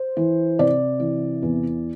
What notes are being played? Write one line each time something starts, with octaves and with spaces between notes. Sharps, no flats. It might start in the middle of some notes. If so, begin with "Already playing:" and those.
Already playing: C5
E3
C3 D5
E3
E2